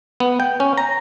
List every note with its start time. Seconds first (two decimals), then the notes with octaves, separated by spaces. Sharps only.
0.20 B3
0.40 G5
0.60 C#4
0.78 A#5